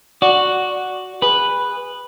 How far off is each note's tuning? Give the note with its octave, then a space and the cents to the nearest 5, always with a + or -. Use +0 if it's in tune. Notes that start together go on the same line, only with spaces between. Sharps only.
F#4 +0 D5 +0
G#4 -25 B4 +0